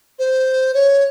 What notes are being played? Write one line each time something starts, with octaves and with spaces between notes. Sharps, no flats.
C5
C#5